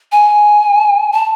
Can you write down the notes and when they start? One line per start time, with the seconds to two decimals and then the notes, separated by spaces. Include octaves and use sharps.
0.12 G#5
1.12 A5